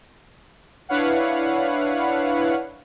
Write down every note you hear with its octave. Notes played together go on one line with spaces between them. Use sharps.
D4 E4 B4 C#5 F5 F#5